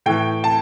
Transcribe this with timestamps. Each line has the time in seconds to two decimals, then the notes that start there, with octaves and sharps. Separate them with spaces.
0.06 A2 E3 G5
0.44 A5